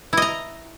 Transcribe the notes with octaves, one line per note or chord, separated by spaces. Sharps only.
E4 D#5 A#5